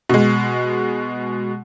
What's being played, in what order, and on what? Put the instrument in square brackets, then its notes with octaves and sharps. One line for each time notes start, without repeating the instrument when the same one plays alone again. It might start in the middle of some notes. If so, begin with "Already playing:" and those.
[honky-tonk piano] B2 G#3